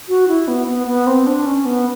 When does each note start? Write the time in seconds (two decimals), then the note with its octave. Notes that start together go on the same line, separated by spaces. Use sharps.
0.09 F#4
0.28 E4
0.48 B3
0.67 B3
0.87 B3
1.07 C4
1.27 D4
1.46 C#4
1.66 B3